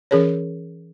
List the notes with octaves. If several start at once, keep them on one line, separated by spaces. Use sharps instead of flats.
E3 C#4 G#4 A#4 C#5